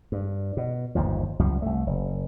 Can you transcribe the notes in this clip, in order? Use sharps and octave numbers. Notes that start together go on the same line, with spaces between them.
G2
B2
G1 D#2 G#2 F3
C#2 F#2 F3 G3
C2 A3
F#1